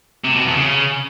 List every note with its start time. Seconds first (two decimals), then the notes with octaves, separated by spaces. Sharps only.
0.24 C3
0.35 B2
0.45 E2
0.56 C#3